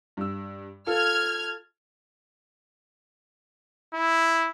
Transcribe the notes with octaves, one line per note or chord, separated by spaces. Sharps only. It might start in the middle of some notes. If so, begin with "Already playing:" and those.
G2 E6
F4 A4 F6 G#6
E4